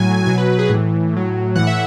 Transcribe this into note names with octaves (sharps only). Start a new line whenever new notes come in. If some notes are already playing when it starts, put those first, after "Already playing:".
Already playing: A2 F#3 G#5
B2 F#3 G#5
B4
G#4
A2 E3
A2 F#3
A2 E3 F#5
E5